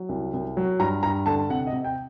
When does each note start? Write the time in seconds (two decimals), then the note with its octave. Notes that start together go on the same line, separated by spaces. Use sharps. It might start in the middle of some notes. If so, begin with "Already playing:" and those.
Already playing: F#3
0.09 C2
0.33 C2
0.57 F#3
0.79 G2 A#5
1.03 G2 A#5
1.26 D3 A5
1.50 C3 F#5
1.67 D#5
1.72 C3
1.84 G5